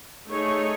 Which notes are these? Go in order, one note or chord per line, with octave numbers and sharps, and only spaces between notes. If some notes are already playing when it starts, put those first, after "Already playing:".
A3 D#4 G#4 C#5